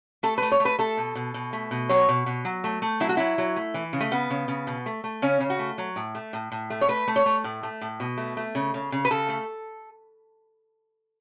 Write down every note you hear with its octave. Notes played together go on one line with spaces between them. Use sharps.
A3 A4
A3 B4
C#5
A3
B4
A3 A4
B2
B2
B2
A3
B2
F#3 C#5
B2
B2
F#3
A3
A3
F#3 E4
F#4
F#3 E4
F#3
A3
E3
C#3
A3
C#3 B3
C#3
C#3
B2
A3
A3
C#3 C#4
C#3
F#4
A3
F#3
A2
A3
A2
A2
A3
C#5
A3 B4
A3
C#5
A3
A2
A3
A2
B2
A3
A3
C#3
C#3
C#3
B4
C#3 A4
A3